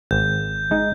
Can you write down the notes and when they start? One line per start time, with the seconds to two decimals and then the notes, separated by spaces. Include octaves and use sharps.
0.11 G#1 G6
0.71 G#3 D#4